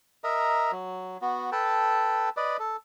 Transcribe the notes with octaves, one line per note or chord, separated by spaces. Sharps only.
A#4 D#5 E5 A#5
F#3
B3 F#4
A4 B4 G5 A5
B4 D5 D#5
A4